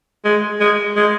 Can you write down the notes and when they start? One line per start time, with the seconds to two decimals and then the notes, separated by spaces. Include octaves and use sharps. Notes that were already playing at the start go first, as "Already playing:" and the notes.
0.25 G#3
0.60 G#3
0.96 G#3